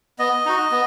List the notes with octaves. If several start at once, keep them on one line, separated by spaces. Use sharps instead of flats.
B3 D#5
D#4 F#4
B3